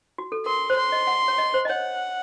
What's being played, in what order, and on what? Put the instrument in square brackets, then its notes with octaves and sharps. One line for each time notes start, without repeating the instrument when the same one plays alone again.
[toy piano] F#4
A4
[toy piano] A#4 [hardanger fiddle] C6
[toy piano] C5
[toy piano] C#5 [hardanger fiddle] C6
[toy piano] D#5
F#5
C#5
D#5
C5
D#5
[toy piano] C#5 [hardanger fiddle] F#5